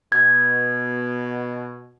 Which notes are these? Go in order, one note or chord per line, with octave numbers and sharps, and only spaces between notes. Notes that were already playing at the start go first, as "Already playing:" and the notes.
B2 G#6